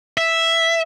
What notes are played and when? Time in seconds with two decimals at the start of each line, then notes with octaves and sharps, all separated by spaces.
0.17 E5